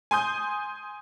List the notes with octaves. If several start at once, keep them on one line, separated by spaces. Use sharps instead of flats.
G#5 C6 D#6 G6